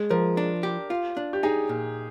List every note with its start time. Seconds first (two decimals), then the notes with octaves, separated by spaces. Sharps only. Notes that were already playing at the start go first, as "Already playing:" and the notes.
Already playing: G#3
0.10 F3 A#4
0.37 D4
0.63 G4
0.90 F4
1.17 D4
1.33 G4
1.43 D#4 G#4
1.69 A#2